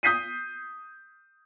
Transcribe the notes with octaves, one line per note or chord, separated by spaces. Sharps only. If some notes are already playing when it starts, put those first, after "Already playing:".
D#6 G6 B6 C7 D#7